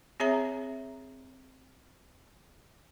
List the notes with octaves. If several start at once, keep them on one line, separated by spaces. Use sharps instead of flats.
C4 G#4 C#5 E5 A#5